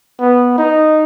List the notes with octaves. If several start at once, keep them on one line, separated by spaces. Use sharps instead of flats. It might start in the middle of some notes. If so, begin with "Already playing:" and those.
B3
D#4